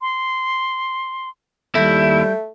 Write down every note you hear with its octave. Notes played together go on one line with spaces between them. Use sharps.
C6
D#2 G3 A3 E4 G6